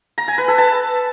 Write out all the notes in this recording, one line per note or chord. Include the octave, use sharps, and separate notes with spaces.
A#5
G#5
B4
A4
A5